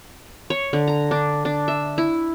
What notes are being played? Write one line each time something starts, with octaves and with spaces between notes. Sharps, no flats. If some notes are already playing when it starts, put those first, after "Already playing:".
C#5
D3
A#5
D4
D4
E5
E4